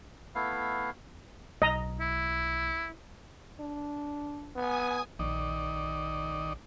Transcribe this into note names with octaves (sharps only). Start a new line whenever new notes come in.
A3 B3 E4 F5
B1 D#5 A#5
E4
D4
B3 G#5 D#6
A#1 D#3 D5 D#5